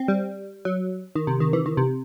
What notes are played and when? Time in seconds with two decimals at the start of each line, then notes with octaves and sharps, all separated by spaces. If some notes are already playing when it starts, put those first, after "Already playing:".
Already playing: C4
0.08 G3
0.65 F#3
1.15 D#3
1.27 C3
1.40 D#3
1.53 E3
1.66 D#3
1.77 C3